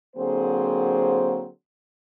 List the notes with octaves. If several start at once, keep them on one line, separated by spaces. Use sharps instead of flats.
D3 F#3 A#3 C4 G#4 C5